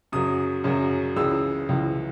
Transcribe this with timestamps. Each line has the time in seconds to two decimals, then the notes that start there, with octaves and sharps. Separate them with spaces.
0.12 F#2 C#3 F#3 D#6
0.64 F#2 C#3 F#3
1.16 C#2 C#3 E3 E6
1.69 C#2 C#3 E3